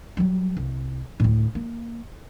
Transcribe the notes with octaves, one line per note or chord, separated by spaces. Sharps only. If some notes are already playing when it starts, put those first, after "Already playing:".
F#3 G3
C2
D2 A2
A#3